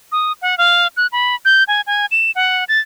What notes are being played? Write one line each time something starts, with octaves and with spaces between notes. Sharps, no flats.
D#6
F#5
F5
F#6
B5
G6
G#5
G#5
E7
F#5
A6